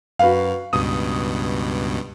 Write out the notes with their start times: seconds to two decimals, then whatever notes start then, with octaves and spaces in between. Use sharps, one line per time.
0.19 F#2 F#4 B4 F5
0.73 C#2 G2 B2 D#6